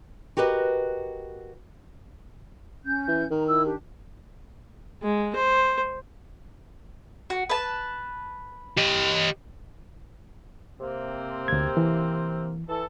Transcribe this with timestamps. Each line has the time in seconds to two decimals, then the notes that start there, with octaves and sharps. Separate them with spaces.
0.37 F#4 G4 A#4 B4 D#5
2.83 C#4 G6
3.08 E3
3.31 D#3 A#5
3.46 E4 E6
3.64 D4 G4
5.03 G#3
5.35 C5
7.30 F#4
7.49 B4 A5
8.77 G4 D#5
10.80 C3 A#3 C4
11.48 D2 G#6
11.77 E3
12.68 E3 A4